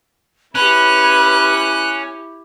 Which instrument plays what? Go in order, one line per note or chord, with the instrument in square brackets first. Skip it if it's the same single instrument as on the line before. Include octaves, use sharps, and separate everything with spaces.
[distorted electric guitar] C#4 [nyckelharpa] E4 G4 [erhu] B4 [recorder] F#6